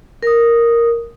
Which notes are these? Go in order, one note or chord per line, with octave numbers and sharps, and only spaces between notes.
A#4 D#6